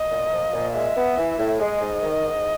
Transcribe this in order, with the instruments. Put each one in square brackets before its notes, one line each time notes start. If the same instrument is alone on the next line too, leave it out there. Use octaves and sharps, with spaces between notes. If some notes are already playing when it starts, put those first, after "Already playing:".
Already playing: [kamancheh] D#5
[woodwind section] A#2
F3
A#2
[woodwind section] G#3 [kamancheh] E5
[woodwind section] B3
E3
A2
[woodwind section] G#3 [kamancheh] D#5
[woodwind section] G#2
D#3
G#2